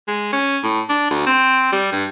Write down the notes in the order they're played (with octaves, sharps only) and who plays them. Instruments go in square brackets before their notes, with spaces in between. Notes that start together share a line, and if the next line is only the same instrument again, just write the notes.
[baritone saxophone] G#3
C#4
A2
D4
D2
C4
G3
G2